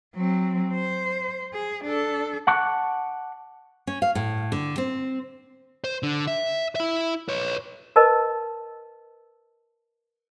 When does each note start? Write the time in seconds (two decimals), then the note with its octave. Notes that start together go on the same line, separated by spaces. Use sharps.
0.15 F#3 C4
0.73 C5
1.53 G#4
1.84 D4 A4
2.47 F#5 A5 C#6 D6 F#6
3.87 C#4
4.02 F5
4.15 A2
4.52 D3
4.78 C4
5.84 C5
6.03 D3
6.27 E5
6.75 E4 E5
7.28 B4 C#5
7.96 A#4 B4 D#5 A5